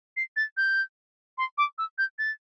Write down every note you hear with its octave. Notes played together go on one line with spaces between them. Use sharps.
C7
A6
G6
C6
D6
E6
G6
A6